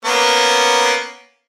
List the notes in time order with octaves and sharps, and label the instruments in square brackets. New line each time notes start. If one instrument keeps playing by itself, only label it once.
[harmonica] A#3 B3 C#4